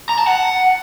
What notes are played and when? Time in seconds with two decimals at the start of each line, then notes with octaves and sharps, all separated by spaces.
0.09 A#5
0.18 A5
0.27 F#5